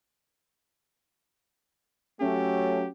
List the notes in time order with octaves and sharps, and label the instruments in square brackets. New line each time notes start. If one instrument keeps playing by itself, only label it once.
[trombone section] F#3 A3 [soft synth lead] C#4 [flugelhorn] G4